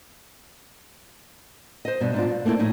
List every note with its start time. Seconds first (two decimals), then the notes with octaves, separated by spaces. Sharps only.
1.85 C5 D#5
2.01 G2 B2
2.14 G#2 D4 F4
2.29 G2
2.45 A3 A#3 C4 E4 A4
2.59 A2 F3 D#4 E4